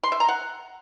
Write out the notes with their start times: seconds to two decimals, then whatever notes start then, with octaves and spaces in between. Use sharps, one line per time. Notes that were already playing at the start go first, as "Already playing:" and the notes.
0.03 C6
0.12 E5
0.20 A#5
0.29 F#5